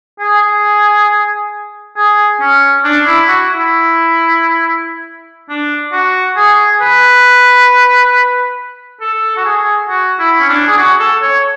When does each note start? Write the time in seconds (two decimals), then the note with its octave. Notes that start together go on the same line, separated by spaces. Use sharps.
0.20 G#4
1.96 G#4
2.41 C#4
2.84 D4
3.06 E4
3.28 F#4
3.51 E4
5.49 D4
5.92 F#4
6.37 G#4
6.81 B4
9.01 A4
9.37 F#4
9.45 G#4
9.89 F#4
10.19 E4
10.41 C#4
10.49 D4
10.67 G#4
10.78 F#4
11.00 A4
11.22 C#5